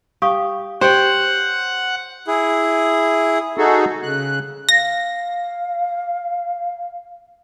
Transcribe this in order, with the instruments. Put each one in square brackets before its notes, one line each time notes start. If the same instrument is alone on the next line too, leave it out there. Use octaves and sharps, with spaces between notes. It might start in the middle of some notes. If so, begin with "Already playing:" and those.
[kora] G4 [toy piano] F5 C#6 D#6
[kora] G4 C#5 G5 [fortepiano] C5 [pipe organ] F#5
[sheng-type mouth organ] E4 G#4
[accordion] D#4 F#4 G#4 A4
C#3 F#6
[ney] F5 [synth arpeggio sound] A#6